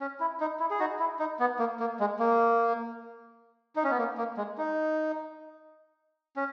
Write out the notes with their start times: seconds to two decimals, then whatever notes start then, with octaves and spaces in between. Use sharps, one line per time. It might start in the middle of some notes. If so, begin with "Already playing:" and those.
0.01 C#4
0.20 E4
0.40 D#4
0.60 E4
0.71 G#4
0.79 D#4 F#4
0.99 E4
1.19 D#4
1.40 B3
1.59 A#3
1.80 A#3
2.00 G#3
2.19 A#3
3.76 D#4
3.84 C#4
3.90 B3
3.98 A#3
4.18 A#3
4.37 G#3
4.58 D#4
6.36 C#4